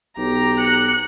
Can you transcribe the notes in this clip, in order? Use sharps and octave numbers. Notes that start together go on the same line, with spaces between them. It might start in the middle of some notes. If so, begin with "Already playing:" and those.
B1 G4 A#5
F#6 C#7